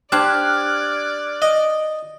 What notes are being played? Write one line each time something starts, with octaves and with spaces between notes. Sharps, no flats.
D4 G4 C5 D5 F6 F#6 G#6
D#5